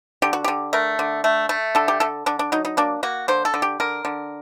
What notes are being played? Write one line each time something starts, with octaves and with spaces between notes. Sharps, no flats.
D3 G4
F#4
D3 G4
A3 A#4
D3
A3
A3
D3 A4
G4
D3 A4
D3 D4
D4
F#3 D#4
D#4
A#3 D4
A#3 F#4
D3 C5
A4
D3
G4
D3 A#4
D3